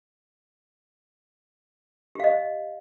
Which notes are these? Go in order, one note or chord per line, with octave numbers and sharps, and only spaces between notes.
G4 D#5 F5